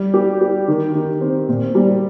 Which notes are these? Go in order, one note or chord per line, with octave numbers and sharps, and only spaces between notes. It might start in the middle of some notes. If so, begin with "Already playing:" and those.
Already playing: G3
G4
G4
D#3
D#3
C4
A#2
G3